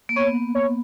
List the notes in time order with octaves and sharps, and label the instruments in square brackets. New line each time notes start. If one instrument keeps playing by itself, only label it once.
[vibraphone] A#3
[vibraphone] B3 [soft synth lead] C#5
[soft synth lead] C#5